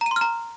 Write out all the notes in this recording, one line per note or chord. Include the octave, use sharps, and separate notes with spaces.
A#5
D#7
C6
F6
A#5